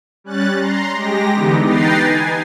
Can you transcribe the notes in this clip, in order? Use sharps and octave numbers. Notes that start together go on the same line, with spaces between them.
G3 C#4 F#6 A6
A#5 C6
G#3 G4 A#6
D3 E3 B3 D#4 G4
D#4 B4 G5 A#5 A6 C7
G#5